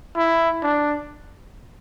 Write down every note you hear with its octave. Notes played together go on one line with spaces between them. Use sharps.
E4
D4